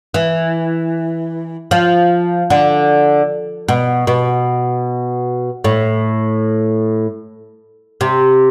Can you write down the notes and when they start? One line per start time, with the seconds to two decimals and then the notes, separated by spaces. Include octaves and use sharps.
0.14 E3
1.71 F3
2.50 D3
3.68 B2
4.07 B2
5.64 A2
8.01 C3